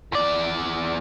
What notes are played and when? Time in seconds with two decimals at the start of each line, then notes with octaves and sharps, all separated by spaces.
0.12 E2 D5